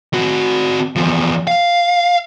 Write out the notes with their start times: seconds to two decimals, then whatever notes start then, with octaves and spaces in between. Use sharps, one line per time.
0.13 C4 F#4
0.96 E2 F3
1.47 F5